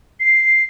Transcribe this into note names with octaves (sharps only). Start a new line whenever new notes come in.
C7